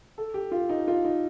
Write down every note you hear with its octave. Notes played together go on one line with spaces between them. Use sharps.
A4
G4
F4
D#4
F4
D#4